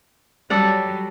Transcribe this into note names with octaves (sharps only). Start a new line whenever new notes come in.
F#3 G3 A4 D5 F#5